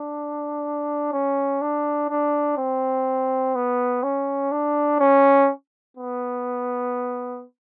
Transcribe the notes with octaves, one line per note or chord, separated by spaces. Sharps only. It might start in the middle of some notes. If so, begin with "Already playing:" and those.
Already playing: D4
C#4
D4
D4
C4
B3
C#4
D4
C#4
B3